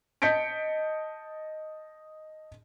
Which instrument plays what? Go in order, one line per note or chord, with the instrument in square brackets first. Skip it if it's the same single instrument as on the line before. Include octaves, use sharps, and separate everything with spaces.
[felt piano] D#5 A5 G6 B6 C#7 D7